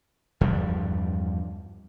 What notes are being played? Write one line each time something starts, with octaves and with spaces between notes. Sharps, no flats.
E2 G2 F3 G3